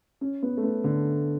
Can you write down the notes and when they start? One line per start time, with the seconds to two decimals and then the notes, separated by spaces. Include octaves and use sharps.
0.21 C#4
0.42 B3
0.57 A3
0.63 B3
0.84 D3